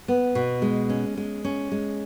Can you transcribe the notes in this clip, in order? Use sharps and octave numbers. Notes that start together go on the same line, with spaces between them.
B3
B2
G#3
C#4
G#3
C#4
G#3